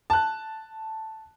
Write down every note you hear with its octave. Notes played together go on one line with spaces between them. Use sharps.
A5 F#6